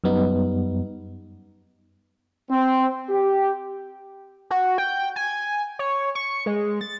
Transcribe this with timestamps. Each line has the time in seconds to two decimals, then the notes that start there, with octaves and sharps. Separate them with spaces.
0.04 F#2 G3 B3 D#4
2.50 C4
3.09 G4
4.50 F#4
4.78 G5
5.16 G#5
5.79 C#5
6.15 C#6
6.46 G#3
6.81 A6